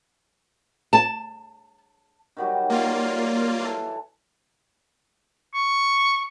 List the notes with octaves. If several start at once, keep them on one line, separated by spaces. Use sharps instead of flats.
A5
D#3 F#3 G3
A#3 F4 D5
E3 A4
C#6